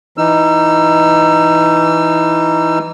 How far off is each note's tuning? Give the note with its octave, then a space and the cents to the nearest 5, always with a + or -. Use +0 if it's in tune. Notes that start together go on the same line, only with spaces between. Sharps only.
E3 +0 D#4 +0 E6 +35